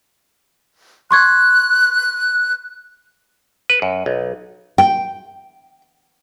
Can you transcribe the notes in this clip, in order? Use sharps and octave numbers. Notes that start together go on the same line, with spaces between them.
C6 C#6 F#6 G#6
B4
F#2
B1
G5